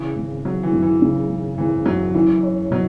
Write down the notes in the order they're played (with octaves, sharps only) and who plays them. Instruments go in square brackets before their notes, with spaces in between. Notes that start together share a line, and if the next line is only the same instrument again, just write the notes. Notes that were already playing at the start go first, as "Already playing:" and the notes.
Already playing: [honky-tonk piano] C#3 [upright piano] E3
[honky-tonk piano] G#1
[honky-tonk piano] G#1 [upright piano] F#3
[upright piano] E3
[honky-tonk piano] F#2
[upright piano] E3
[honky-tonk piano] C#3
G#1
[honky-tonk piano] G#1 [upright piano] E3
[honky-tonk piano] F#2 [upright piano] F#3
[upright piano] E3 [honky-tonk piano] E4
[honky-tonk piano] C#5
[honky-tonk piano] B2 [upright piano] F#3